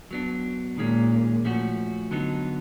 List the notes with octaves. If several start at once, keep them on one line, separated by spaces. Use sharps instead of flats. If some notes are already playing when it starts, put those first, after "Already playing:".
F#3 B3 D4
A#2 D#3 G#3 C#4
F3 A3 C#4 F#4
D3 F#3 B3 D#4